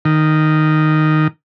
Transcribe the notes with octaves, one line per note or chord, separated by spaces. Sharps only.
D#3